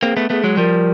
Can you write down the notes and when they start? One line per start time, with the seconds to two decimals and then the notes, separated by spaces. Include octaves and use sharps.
0.03 A#3 C4 G#4
0.17 A3 B3
0.30 A3 B3 G#4
0.44 F#3 G#3
0.57 F3 G3 A#4